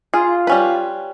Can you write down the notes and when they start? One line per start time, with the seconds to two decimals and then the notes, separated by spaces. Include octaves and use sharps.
0.14 F4 G#4
0.47 G3 C#4 B4